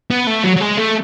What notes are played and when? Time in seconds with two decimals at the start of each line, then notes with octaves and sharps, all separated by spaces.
0.10 B3
0.27 A3
0.44 F#3
0.56 F#3
0.61 G#3
0.78 A3